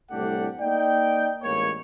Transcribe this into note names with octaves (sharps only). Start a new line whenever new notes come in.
C2 A2 A3 D4 G4 F#5
A#3 D#4 D5 G5
A1 G#2 A#3 C#5